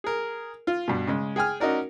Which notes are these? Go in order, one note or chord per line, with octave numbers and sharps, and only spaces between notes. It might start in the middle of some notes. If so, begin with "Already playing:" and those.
G#4 A#4
F4
G2 B2
C#3 G#3
G#4 G5 G#5 F6
C#4 D#4 F#4 A#4 D5